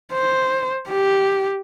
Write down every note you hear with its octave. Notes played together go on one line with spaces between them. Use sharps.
C5
G4